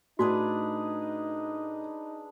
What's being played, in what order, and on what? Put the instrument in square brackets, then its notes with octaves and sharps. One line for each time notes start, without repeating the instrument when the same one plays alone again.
[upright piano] A2 [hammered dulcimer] D4 G#4 B4 [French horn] D#4 [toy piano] F#4